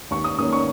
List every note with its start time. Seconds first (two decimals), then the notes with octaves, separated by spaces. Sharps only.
0.10 D#2 C#6
0.24 D#6
0.38 D#3 A#3 C#4 D#6
0.53 C#6